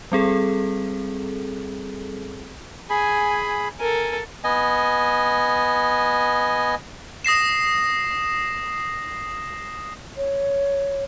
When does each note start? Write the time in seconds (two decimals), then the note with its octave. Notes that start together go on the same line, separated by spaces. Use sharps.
0.12 G3 C4 G#4 A4
2.90 G#4 G#5 B5
3.80 A4 A#4 G#5
4.44 B3 D#5 G#5
7.25 D#6 A#6 C7 E7
10.17 C#5